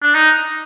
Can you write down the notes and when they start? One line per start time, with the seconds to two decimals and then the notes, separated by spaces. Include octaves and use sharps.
0.02 D4
0.15 D#4